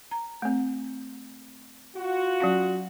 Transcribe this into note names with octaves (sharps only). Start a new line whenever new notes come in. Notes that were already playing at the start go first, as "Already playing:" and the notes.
A#5
A3 C4
F4 F#4
F#3 C#4 F5